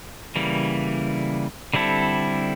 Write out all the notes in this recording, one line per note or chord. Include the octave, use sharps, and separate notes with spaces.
C#3 E3 G3 A#3
D3 G3 C4 E4 A4